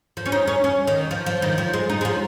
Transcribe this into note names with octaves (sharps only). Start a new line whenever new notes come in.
F3
C#4
D#4
C#4
C#4
D#3
F3
F3
D#3
F3
G#3
D#4
G#3
F3